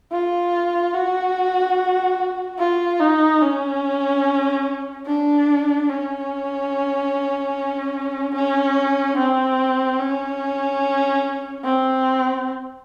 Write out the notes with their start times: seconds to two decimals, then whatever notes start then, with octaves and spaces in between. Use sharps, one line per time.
0.12 F4
0.94 F#4
2.59 F4
3.00 D#4
3.42 C#4
5.06 D4
5.89 C#4
8.35 C#4
9.18 C4
10.00 C#4
11.64 C4